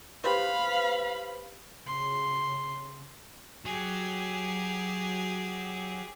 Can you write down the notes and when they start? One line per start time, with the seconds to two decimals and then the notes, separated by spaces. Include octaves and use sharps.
0.24 G4 B4 C5 F5 B5
1.87 C#3 C6
3.65 F#3 G4 G#4